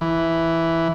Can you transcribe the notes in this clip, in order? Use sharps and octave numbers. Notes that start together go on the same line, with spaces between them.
E3